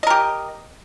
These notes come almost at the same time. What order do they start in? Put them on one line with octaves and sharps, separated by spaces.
D#5 A#4 G4